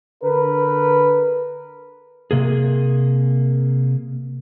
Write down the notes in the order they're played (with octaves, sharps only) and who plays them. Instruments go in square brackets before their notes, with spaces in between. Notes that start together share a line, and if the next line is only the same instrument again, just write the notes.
[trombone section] D3 A#4 B4
[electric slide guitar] C3 A#3 G#4